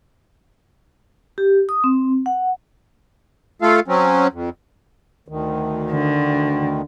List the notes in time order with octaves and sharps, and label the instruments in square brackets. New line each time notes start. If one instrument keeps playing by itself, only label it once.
[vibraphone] G4
D#6
C4
F#5
[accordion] A3 F4 A4 F5
F#3 C4 C#4
F2
D2 D#3
[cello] D3